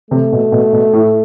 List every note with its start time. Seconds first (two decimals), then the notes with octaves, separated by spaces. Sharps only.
0.11 C3 A3
0.32 B2
0.52 B2
0.73 B2
0.93 A2